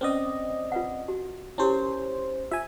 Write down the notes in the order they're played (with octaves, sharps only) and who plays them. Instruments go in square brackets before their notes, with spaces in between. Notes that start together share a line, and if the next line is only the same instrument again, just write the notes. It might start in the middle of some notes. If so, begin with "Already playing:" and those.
[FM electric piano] C4 D5 D#5 [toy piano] C#4 B4
[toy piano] F4 B4 F#5
F#4
[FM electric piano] C#4 C5 [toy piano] E4 G4 A#4
[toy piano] F4 [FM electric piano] E5 G#5